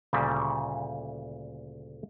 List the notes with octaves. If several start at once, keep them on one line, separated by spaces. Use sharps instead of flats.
D2 A#2 C#3 G3